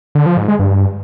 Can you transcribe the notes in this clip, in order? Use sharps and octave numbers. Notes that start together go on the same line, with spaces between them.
D3
F3
G#2
G#3
G2